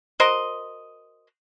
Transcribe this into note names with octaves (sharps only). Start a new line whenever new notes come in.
F#4 A#4 C5 D#5